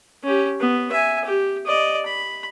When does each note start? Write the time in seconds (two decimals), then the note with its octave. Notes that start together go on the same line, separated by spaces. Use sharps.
0.24 C#4 G4
0.60 B3
0.92 E5 G#5
1.25 G4
1.67 D5 D#5
2.06 B5